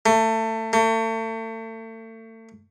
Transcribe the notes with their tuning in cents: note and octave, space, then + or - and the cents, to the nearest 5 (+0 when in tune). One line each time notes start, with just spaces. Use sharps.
A3 +25
A3 +35